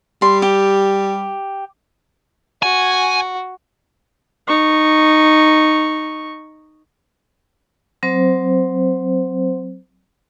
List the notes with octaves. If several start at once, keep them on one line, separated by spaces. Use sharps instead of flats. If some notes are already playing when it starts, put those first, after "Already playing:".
G3 C6
G4
F#4 G#5
D#4 C#6
F#3 C4 C5